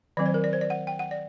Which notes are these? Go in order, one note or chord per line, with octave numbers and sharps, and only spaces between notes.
D#3 F#3 C4 D5
C5
A#4
D5
C5
D5
F#5
G5
F#5
D5